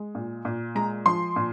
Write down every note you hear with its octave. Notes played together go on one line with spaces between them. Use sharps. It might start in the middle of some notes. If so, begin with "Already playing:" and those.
Already playing: G#3
A#2
A#2
G#3 A#5
F3 C6
A#2